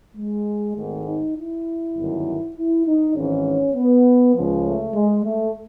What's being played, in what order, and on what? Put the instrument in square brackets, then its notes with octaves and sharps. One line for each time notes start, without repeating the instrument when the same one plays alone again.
[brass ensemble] G#3
G#1 G#2 D#3 A3
D#4
E4
G1 F#2 D#3
E4
D#4
G#1 G#2 E3 C#4
B3
C#2 C#3 F3
A3
G#3
A3